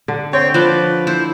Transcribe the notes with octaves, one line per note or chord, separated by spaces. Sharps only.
D3
C4 C#5 G5
F3 B4 D5
E4 C5